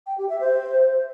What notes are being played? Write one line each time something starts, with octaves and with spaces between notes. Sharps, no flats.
G5
G4
E5
C5